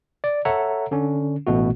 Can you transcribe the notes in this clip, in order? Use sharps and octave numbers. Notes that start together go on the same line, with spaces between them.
D5
A4 C#5 E5 F#5 A#5
D3 C#4
A1 B2 A3 F#4